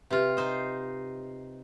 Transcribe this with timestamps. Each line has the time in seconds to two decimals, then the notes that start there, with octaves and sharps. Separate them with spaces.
0.11 C3 F4 G4 B4 E5
0.37 D#4 C5 D#5